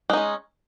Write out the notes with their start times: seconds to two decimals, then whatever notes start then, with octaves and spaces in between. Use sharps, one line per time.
0.10 G#3
0.13 D#4
0.17 C#4